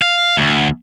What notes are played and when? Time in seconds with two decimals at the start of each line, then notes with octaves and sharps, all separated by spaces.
0.02 F5
0.37 D2